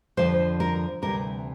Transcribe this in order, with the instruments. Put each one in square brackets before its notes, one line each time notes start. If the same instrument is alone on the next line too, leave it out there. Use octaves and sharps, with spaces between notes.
[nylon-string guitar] F2 D3 F3 C5
A#4
D2 C3 E3 G3 A#4